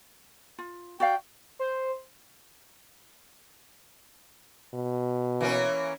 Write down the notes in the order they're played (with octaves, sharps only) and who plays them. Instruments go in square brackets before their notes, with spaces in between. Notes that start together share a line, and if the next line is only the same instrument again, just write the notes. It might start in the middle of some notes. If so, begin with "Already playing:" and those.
[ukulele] F4
[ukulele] F#4 D5 F5 [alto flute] G5
[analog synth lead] C5
[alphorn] B2
[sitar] E3 A#3 C#4